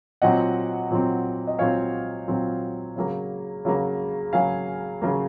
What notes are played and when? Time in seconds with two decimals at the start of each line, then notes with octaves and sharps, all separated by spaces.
0.22 A#2 F#3 C4 D#5 F#5
0.91 A#2 F#3 C4
1.47 D#5
1.59 A#2 F#3 C4 C#5 F5
2.28 A#2 F#3 C4
2.96 C#3 F#3 A#3
3.65 C#3 F#3 A#3
4.33 C#3 F#3 A#3 F5 G#5
5.02 C#3 F#3 A#3